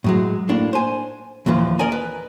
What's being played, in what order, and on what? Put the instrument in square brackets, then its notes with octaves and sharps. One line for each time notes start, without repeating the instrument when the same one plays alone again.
[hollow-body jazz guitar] A2 F#3 G#3
A2 A#3 D4
C5 G#5
D#2 A#2 E3 F3
A#4 D5 D#5 G#5 A#5
B4